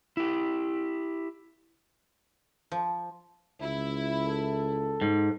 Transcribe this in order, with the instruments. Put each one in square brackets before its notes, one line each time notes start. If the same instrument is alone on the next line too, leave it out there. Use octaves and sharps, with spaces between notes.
[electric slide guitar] E4 G4
[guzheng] F3
[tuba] C#2 [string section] E4
[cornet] A4
[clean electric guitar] G#2